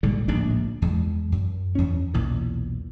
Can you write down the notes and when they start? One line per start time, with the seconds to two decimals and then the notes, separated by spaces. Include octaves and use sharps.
0.03 A#1 G#2 D3 G3
0.28 D1 A#1 G#2 D4
0.82 E2 G#3
1.32 F#2
1.75 E2 C#4
2.14 B1 E2 A#2